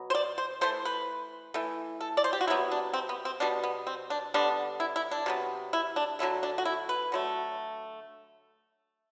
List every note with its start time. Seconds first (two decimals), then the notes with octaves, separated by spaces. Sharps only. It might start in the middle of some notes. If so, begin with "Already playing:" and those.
Already playing: B2 F#3 B3
0.10 C5
0.15 D5
0.38 C5
0.61 E3 A3 C5
0.85 B4
1.54 E3 A3
2.01 A4
2.17 D5
2.24 C5
2.33 G4
2.41 F#4
2.47 C3 F#3 B3 E4
2.71 D4
2.94 C4
3.09 B3
3.25 C4
3.40 B2 G3 B3 D4
3.63 B3
3.87 C4
4.10 D4
4.34 D3 G3 B3 D4
4.80 E4
4.96 E4
5.11 D4
5.26 C3 F#3 B3
5.73 E4
5.96 D4
6.19 D3 F#3 A3 E4
6.43 D4
6.58 F#4
6.65 E4
6.89 B4
7.12 D3 F#3 A3